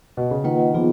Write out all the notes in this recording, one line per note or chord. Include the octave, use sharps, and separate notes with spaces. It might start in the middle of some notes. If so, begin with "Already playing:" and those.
B2
C#3
D#3 A#3 F4 B4 D#5 F#5
F3 B3 F4 G#4